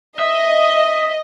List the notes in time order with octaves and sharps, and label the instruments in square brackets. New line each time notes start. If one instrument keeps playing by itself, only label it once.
[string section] D#5 [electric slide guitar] E5 [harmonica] D#6